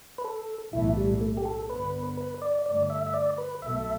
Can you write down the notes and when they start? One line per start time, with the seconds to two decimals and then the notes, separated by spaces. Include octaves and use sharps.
0.18 B4
0.24 A4
0.73 B1 A2 E3 A3 E4
0.97 G3
1.21 A3
1.37 G4
1.45 A4
1.69 G2 D3 B3 B4
2.17 B4
2.42 D5
2.66 G2 D3 A3 D5
2.90 E5
3.07 E5
3.14 D5
3.38 B4
3.62 B1 B2 A3 E5